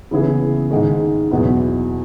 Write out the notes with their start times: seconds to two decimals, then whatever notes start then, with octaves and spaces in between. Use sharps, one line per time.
0.11 C#3 E3 B3 E4 G#4
0.71 G#2 D#3 G#3
1.31 E2 B2 F#3 B3 E4